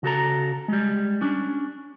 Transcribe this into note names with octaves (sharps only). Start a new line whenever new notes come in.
C#3 F#4 A4 A#5
G3 G#3
C#4 D4